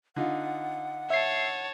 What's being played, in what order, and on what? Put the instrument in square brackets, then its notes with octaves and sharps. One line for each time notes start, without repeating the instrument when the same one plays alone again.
[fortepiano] D3 D#4 F4 [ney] F#5
[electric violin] C#5 A5 [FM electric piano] E5 C7